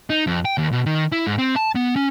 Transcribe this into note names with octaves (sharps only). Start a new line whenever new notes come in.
D#4
F2
G5
D#2
B2
D#3
E4
G#2
C4
A5
B3
C#4